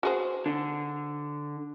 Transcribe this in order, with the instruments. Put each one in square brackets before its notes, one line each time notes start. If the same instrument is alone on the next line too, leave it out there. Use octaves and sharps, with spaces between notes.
[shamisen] F#4 G#4 C5
[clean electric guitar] D3